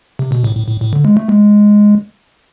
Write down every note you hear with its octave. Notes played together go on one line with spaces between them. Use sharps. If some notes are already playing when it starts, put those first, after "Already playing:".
C3
B2
A2
A2
A2
A2
D3
G#3
A3
G#3